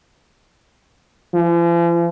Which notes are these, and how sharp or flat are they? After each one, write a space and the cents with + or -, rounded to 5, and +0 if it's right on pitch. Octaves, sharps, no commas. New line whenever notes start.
F3 -45